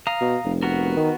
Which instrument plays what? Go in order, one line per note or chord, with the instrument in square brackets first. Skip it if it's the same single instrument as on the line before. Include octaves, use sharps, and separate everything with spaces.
[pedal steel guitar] F5 A#5 D#6
[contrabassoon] B2
F1
[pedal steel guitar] B3 F#4 A#4
[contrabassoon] D#3